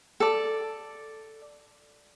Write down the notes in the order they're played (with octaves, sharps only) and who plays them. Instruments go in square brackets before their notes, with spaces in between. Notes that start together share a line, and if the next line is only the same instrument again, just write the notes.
[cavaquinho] A4 D5